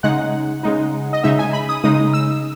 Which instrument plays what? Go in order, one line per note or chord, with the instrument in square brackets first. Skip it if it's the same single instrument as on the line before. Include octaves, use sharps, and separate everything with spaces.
[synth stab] C#3 G#3 D#4 F#5
C#3 G#3 D#4
D#5
C#3 G#3 D#4 E5
G#5
B5
D#6
C#3 G#3 D#4 D#6
E6